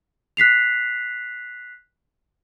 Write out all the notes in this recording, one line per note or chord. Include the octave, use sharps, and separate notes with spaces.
F#6 B6 C7 F7